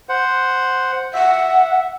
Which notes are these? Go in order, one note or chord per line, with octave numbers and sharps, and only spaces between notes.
C5 F#5
E5 F#5